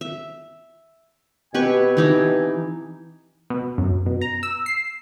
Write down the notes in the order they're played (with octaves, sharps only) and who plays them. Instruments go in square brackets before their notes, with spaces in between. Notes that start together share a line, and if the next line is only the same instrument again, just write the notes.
[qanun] E5
[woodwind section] B2 C4 G#5 [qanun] G4 B4 C#6
[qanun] E3 D#4 G4
[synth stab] B2
F#2
B2
A#5
E6
C7